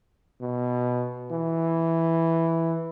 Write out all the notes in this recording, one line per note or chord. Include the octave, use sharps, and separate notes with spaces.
B2
E3